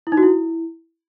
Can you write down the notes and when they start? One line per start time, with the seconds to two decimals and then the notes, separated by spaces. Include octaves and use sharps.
0.07 E4
0.12 D#4
0.17 F#4
0.23 E4